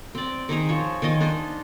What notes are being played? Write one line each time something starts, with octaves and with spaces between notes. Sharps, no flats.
C4 D5
D#3 D#4 G#4 A#5
F3 C#5
D#3 F4 D#5 G#5
D4 D#4 C5